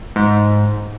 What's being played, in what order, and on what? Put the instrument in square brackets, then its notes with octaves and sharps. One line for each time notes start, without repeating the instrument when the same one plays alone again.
[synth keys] G#2